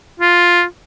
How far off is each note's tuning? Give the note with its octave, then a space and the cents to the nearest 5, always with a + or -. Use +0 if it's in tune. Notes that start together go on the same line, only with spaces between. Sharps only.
F4 +5